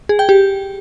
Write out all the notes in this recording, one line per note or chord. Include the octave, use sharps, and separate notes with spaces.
G#4
G5
G4